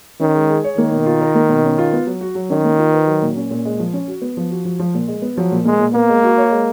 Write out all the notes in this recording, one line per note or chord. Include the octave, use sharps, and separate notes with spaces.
D#3 C#4
G#3
G#4
C#5
D#3 A#3
B2
F4
A#4
A#3
B2
C#4
F4
B3
F#3
F#4
F#3
D#3 C#4
A#3
F4
B4
F#3
A#2
C#4
A#2
G#3
F3
C#4
F#4
B3
F3
F#4
F3
F3
A#2
G#3
B3
F3 F#3
A#2
G#3 A#3
A#2
A#3 B3
G#3
F#4
C#5
G#3